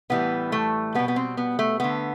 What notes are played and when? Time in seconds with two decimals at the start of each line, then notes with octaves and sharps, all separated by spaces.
0.10 A2 E3 G3 B3
0.52 A3
0.95 B2 G3 B3
1.08 B3
1.16 C4
1.37 B3
1.59 A3
1.80 D3 A3 B3